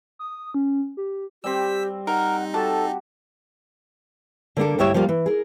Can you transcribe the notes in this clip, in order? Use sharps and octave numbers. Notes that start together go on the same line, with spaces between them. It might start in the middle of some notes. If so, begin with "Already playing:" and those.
D#6
C#4
G4
G3 C4 G4 E6 B6
D#4 A#4 F#5
F#4 G4 A4 A5
D3 A#3 D4 A4
D2 G2 E4 G4 C#5 E5
F3 G3 A#3 F5
E3
G#4 A#4